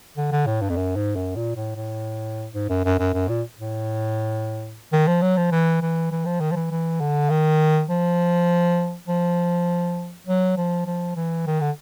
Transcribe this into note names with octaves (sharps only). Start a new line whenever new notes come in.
D3
D3
A2
G2
F2
F#2
G#2
F#2
A#2
A2
A2
G#2
F#2
F#2
F#2
F#2
A#2
A2
D#3
F3
F#3
F3
E3
E3
E3
F3
D#3
F3
E3
E3
D3
D#3
F3
F3
F#3
F3
F3
E3
D#3
D3